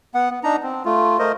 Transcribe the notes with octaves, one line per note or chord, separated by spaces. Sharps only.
B3 F#5
B3
D4 D#4 A#5
C4
A3 F4
A3 A#4 C5 D#5